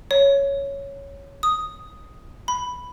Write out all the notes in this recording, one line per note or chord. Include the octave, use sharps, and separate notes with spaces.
C#5
D#6
B5